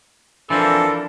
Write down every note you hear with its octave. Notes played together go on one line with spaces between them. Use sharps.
E3 F3 C4 D4 A4 A#4